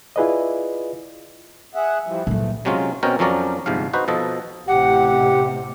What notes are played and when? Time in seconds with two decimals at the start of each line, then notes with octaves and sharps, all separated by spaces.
0.16 E4 F4 G#4 B4 D5 D#5
1.75 G#4 E5 F#5
2.06 E3 F3 G3
2.27 E2 A#2 F#3 A3
2.65 C3 F#3 G#3 C#4 F4
3.03 B2 C4 C#4 A#4 G5
3.19 F2 F3 F#3 C#4 A#4 D5
3.66 G1 G#2 C3 F3 F5
3.93 D#4 F#4 B4 C5
4.08 B2 F3 A4 D#5
4.68 A1 C3 G4 F#5